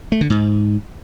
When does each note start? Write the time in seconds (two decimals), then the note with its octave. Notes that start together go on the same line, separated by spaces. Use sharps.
0.12 A3
0.21 D3
0.30 G#2